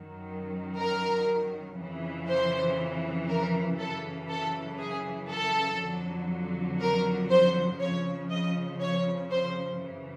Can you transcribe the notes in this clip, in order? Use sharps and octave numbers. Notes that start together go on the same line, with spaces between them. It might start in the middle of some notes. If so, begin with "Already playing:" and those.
Already playing: F#2 D#3 F#3
A#4
F2 C#3 E3
C5
A#4
F#2 C#3 E3 A4
A4
G#4
A4
F2 D3 F#3
A#4
C5
F2 C#3 F3 C#5
D#5
C#5
C5
F#2 C#3 E3